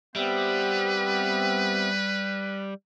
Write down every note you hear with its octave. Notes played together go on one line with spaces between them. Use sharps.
G3 B3 C4 G4 B4 E5